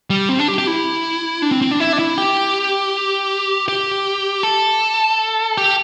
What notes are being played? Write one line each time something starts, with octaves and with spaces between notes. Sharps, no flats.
G3
C4
D4
G4
G4
E4
D4
C4
C4
D4
E4
D4
E4
G4
G4
A4
G4